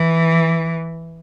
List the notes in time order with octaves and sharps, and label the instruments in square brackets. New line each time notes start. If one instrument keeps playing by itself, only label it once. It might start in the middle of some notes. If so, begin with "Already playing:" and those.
Already playing: [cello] E3